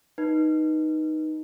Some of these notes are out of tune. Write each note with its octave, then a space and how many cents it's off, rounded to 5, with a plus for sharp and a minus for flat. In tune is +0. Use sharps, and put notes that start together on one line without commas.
D#4 +0 B4 -25